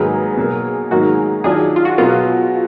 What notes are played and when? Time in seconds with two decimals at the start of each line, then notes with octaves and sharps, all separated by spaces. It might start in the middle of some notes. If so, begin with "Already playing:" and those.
Already playing: G#2 D#3 F#3 A#3 G#4 B4
0.36 B2 F#3 A#3
0.91 G#2 D#3 F#3 A#3 F#4
1.44 D#3 F#3 D4 F4 G#4
1.76 F4
1.85 F#4
1.98 B2 F#3 B3 F4